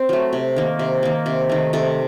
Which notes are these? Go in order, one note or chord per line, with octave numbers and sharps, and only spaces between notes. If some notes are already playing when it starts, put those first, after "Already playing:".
Already playing: C4
F#3 A3
C3
D#3 A#3
C3
D#3 A#3
C3
D#3 A3
C3 A4